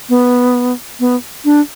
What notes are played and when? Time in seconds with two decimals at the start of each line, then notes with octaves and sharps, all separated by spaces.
0.09 B3
1.00 B3
1.45 D4